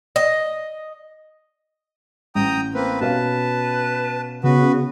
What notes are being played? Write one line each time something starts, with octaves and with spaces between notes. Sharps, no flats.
D#5
A1 G5 A#5 D#6
A#3 C4 B4
B2 C#4 B4 F5 A5
C#3 B3 F#4 B4